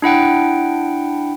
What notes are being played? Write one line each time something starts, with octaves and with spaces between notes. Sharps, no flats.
D4 E4 F#5 G5